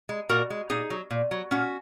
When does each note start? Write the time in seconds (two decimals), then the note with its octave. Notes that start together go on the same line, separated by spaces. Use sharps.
0.09 G#3
0.29 A#2 F#4 A#4
0.50 G#3
0.70 A#2 D#4 G#4
0.90 F#3
1.11 A#2
1.31 F#3
1.51 A#2 C#4 F#4